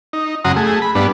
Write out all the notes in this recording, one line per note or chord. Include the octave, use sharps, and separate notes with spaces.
D#4
F#2 C#3 F#5 A#5 C6 D#6
A3 G#4
B5
G2 B3 D4